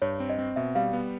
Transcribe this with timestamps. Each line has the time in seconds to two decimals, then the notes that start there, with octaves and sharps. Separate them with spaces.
0.02 G2 C#5
0.20 C4
0.29 D#5
0.39 C4
0.56 B2 E5
0.75 G3 F5
0.93 B3